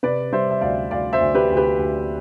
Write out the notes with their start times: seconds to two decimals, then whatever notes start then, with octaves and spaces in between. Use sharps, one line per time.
0.03 C3 B4 D5
0.32 G3 C5 E5
0.51 E5
0.61 D2 D5 F5
0.91 D2 D5 F5
1.13 C5 E5
1.20 D2
1.35 G4 B4
1.50 D2
1.57 G4 B4
1.79 D2